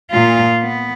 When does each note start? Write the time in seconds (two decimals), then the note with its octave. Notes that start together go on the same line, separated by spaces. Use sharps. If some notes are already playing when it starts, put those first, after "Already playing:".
0.11 A#2 F4
0.63 B3